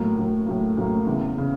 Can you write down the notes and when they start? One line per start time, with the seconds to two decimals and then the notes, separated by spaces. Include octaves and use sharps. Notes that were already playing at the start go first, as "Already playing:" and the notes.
Already playing: A2 F#3 A#3
0.17 A2 F#3 A#3
0.46 A2 F#3 A#3
0.77 A2 F#3 A#3
1.07 E2 C#3 E3
1.38 C#3